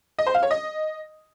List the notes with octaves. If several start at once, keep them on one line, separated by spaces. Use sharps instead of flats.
D#5
C5
F5
C#5
D#5